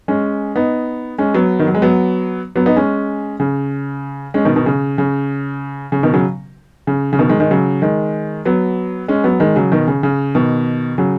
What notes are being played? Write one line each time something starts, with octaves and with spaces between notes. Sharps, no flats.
G#3 C#4
B3 D#4
G#3 C#4
F#3 B3
D#3
F#3
G#3
F#3 B3
F#3 B3
B3 D#4
G#3 C#4
C#3
G#3 C#4
B2 D#3
B2 D#3
C#3
C#3
C#3
B2 D#3
C#3 F#3
C#3
C#3
B2 D#3
D#3 G#3
D#3 G#3
C#3 F#3
D#3 G#3
F#3 B3
G#3 C#4
F#3 B3
D#3 G#3
C#3 F#3
B2 D#3
C#3
C#3
B2 D#3
C#3 F#3